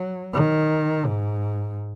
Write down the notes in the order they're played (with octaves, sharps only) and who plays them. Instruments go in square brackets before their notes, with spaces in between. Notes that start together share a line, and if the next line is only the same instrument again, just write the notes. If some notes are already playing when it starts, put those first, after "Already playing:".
Already playing: [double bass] F#3
D#3
G#2